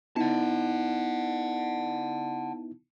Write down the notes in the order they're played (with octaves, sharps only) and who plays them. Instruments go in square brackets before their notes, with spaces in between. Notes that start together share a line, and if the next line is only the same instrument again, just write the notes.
[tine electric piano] B3 D#4 E4 [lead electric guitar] F#5 A5